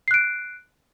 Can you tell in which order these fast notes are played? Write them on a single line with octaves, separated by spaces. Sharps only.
C7 F#6 D7